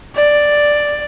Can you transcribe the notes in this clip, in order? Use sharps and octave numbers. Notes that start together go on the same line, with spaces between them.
D5